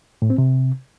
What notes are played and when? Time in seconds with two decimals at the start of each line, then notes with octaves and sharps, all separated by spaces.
0.22 A2
0.30 C4
0.38 C3